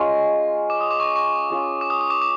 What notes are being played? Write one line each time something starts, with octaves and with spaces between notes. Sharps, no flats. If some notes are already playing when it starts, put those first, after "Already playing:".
Already playing: G#3 C#4 F4 C#6
D6
D#6
D6
C#6
C#6
C#4 F4 G#4
D6
D#6
D#6
D6
D6